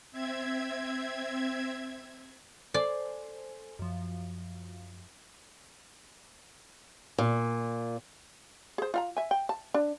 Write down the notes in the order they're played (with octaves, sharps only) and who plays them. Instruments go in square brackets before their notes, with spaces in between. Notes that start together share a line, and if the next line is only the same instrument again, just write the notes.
[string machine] C4 E5 G#6
[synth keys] A4 C5 G#5 [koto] D5
[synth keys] F#2 F3
[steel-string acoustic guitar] A#2
[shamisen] G#4 C5
F4 F5 A#5
E5 G#5
G5
A5
D4